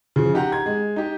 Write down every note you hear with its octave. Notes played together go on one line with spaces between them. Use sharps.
C#3 F3
D#4 G4 F#5 A#5
G#6
G#3
D#4 G4